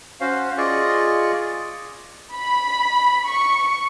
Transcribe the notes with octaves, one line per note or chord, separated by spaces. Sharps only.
C#4 F#4 C5 F5
F4 G#4 D5 D#5 C#6
B5
C#6